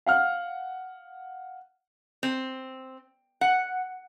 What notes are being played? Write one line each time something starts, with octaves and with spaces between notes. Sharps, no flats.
F5 F#5 F6
C4
F#5